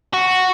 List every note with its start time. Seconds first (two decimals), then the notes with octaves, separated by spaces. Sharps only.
0.13 F#4